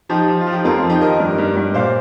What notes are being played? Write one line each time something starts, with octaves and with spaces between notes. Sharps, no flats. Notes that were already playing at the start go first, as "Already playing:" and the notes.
F3 D#4 G4
F3
F4
F3
D#4 G4
F2 F4 A#4
F4
F3
D#4 G4
D#3 A#4 D#5
G2
G2
G2
A#2 C5 F5